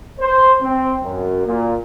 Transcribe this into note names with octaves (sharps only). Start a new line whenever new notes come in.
C5
C4
F#2
A#2